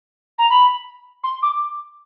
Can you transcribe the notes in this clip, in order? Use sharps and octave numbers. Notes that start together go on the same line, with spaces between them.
A#5
B5
C6
D6